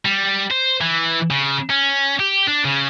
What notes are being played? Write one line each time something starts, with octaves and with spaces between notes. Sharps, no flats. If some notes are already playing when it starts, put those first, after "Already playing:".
G3
C5
E3
C#3
C#4
G4
D4
C#3